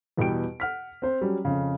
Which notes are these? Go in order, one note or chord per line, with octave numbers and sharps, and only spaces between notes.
E2 B2 G3 G4 G5 D7
F#5 F6 B6
C4 C5
F#3 G3 C#4
F2 C#3